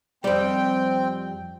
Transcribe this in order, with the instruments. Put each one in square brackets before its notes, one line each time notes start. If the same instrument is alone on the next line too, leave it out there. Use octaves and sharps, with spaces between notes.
[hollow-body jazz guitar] F2 G3 [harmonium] C4 G5